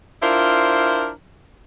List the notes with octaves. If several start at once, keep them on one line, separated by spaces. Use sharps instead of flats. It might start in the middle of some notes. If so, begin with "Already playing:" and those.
D4 E4 F4 A#4 C5